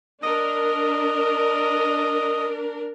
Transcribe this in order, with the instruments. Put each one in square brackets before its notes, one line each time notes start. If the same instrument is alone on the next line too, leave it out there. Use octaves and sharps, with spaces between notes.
[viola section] D4 A#4 [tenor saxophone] D#5